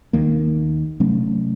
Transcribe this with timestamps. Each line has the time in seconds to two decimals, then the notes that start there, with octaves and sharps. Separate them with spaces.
0.13 D#2 D#3 A#3
1.00 C3 F#3 A3 C#4